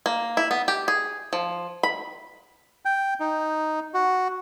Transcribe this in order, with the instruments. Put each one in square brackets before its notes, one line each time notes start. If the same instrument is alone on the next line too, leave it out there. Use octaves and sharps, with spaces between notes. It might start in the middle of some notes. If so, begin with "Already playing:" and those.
[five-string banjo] A#3
E4
B3
G4
G#4
F3
B5
[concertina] G5
D#4
F#4